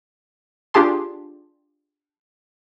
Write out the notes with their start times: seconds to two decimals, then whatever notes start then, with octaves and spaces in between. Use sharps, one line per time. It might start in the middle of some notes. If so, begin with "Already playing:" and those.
0.74 D4 F4 G4 G#4 A5 C6